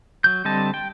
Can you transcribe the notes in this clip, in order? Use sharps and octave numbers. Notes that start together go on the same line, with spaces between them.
F#3 G6
D3 G3 C4 D#5 A5
G5